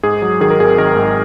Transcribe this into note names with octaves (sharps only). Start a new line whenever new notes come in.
G#2 G#4
F#3
D#3 G#4
A#4
G#1 G#4
D#3 A#4
G#2